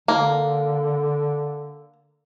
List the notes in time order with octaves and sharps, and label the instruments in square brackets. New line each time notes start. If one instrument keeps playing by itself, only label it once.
[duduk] D3 [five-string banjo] A#3